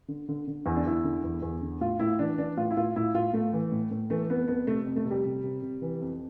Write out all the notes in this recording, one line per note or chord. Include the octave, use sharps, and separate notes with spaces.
D3
D3
D3
E2 E4
D4
E2 E4
D3
E2
E2
D3
A2 F4
A2 E4
E3 D4
E3 D4
A2 F4
E4
A2 F4
A2 E4
A2 F4
A2 A3
E3
A2
A2
E3 A3
F2 B3
F2 B3
C3 A3
F2
A3
C3
G3
C3
C3
C3
E3
F2